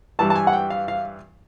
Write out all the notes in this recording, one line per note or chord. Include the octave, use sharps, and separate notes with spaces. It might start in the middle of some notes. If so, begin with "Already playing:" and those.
G2 E3 G3 A5
A5
G#5
F#5
G5
F5
F5